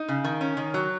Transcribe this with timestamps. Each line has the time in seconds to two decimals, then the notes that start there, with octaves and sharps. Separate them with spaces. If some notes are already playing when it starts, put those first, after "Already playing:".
Already playing: D#4
0.09 C#3
0.24 D#3
0.41 C#4
0.57 D#3
0.74 F#3